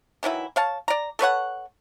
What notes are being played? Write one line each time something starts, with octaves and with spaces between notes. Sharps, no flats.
D#3 E3 F#3 E4
C#5 F5 A5
D5 A#5
A4 B4 C#5 F#5